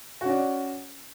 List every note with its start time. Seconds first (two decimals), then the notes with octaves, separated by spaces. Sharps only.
0.21 F#4
0.25 C#4
0.30 D5